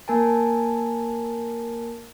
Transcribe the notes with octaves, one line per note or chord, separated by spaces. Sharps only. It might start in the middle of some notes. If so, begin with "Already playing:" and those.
A#3 A#4 G#5 A5